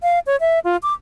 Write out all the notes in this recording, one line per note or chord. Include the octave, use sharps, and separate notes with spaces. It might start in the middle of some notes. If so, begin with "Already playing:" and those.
F5
C#5
E5
F4
D6